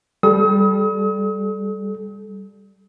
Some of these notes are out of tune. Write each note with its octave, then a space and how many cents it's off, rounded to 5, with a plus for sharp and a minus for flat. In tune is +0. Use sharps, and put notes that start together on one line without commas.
G3 +0 A4 -30 D#6 +40